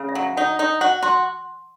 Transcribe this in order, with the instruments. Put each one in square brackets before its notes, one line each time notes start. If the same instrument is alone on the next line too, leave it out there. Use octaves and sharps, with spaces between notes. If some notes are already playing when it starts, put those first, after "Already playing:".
Already playing: [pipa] C#3
[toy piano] E5
[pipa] F#3
[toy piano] E5
[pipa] D#4 [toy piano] F#5
[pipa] D#4
[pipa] F#4 [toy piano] F#5
[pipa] F#4 [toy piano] C6